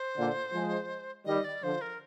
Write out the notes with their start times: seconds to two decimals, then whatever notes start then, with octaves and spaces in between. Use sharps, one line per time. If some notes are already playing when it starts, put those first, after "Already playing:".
Already playing: C5
0.16 A#2 D3
0.53 F3 G#3
1.26 D#3 G3 D#5
1.44 D5
1.63 D3 F3 C5
1.81 A#4